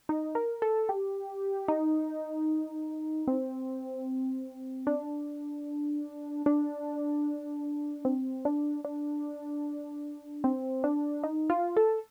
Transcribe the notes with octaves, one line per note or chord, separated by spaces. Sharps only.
D#4
A#4
A4
G4
D#4
C4
D4
D4
C4
D4
D4
C4
D4
D#4
F4
A4